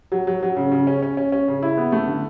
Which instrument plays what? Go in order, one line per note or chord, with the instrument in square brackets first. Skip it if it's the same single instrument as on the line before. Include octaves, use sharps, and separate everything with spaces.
[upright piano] F#3
F#3
F#3
C#3
C#3
C#4
C#4
C#4
C#4
C#3
E4
B3
A3
D3